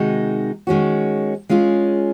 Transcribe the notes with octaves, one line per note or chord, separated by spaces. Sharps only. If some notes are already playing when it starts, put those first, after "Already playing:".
Already playing: C3 D#3 G#3 D#4 F#4
D#3 G#3 C#4 F#4
G#3 C#4 F4 G#4